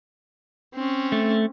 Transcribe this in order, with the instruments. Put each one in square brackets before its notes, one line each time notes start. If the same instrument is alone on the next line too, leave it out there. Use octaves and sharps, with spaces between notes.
[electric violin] C4 C#4
[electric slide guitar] A3